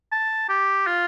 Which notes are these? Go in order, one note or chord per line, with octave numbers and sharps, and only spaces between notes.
A5
G4
F4